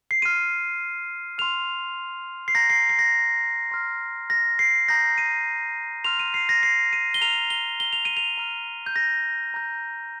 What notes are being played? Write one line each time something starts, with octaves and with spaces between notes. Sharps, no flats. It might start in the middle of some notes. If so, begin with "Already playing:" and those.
C7
C6 F6 D#7
C6 F6 F7
C7
A#5 G6 A#6
C7
C7
A#6
C6 F6
A#6
C7
A#5 D#6 G6 A#6
D#7
C6 F6 F7
D#7
C7
A#6
C7
D#7
G7
A#5 F6 F7
G7
G7
F7
D#7
F7
A#5 F6
G6
A#6
A#5 G6